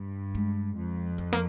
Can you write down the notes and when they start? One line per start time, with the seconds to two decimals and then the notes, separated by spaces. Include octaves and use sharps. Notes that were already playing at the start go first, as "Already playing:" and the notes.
Already playing: G2
0.35 G#3
0.77 F2
1.18 F3
1.33 A#3